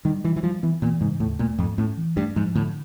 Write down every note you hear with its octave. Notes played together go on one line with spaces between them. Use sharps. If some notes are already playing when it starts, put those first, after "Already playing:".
D#3 G3
E3 G3
E3
F3 G3
E3 B3
A#2 E3
G#2 C#3
D#2 A2
A#2 A3
F2 G#2
A2 C#4
E3
G2 A3
G#2 F3
A2 D3